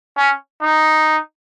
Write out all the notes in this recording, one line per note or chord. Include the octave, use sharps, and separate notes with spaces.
C#4
D#4